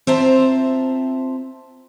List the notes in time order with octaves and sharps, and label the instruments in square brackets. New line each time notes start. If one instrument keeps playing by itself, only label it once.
[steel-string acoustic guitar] C4 F4 C5 E5 A5 A#5